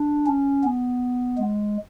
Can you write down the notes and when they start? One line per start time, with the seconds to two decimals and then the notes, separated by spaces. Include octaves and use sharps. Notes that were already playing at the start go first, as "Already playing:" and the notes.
Already playing: D4
0.27 C#4
0.64 B3
1.38 G#3